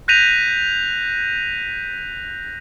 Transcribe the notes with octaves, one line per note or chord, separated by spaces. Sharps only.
F#6 G6 A#6 B6 D#7 F7